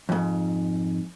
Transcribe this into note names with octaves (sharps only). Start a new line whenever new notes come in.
F2 G#2